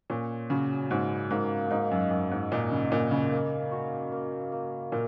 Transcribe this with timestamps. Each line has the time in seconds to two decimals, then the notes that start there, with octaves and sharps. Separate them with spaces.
0.10 A#2 C#4
0.50 C#3 F#3
0.90 G#2 F#3
1.31 G#2 A#3
1.70 G#2 D#4
1.91 F#2
2.11 F#2 D#5
2.31 G#2
2.52 A#2 D#4
2.71 C#3
2.92 A#2 A#4
3.11 C#3
3.32 A#3
3.72 F#4
4.12 A#3
4.52 A#3
4.92 A#2 A#4